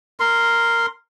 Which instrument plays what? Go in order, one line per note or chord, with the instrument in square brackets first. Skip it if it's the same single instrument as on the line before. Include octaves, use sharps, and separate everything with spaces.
[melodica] A#4 C6